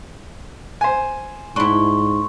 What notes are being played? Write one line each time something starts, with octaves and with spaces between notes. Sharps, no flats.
C5 G#5
G#2 D4 E4 C6 C#6